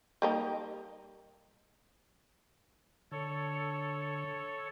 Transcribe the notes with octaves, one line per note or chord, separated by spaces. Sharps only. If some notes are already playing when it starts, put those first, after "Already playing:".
G3 A#3 D#4
D3 A4 C#5